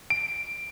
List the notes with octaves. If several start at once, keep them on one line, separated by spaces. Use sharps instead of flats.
D7